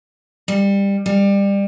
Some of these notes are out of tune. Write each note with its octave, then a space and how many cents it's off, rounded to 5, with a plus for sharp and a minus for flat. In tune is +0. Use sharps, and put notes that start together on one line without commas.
G3 +20
G3 +25